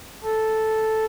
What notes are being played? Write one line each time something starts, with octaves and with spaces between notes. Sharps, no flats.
A4